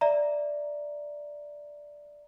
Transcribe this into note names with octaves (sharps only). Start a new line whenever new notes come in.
D5 E5 A#5